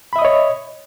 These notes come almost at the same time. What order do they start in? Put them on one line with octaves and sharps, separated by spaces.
B5 E5 D#6 D#5 C#5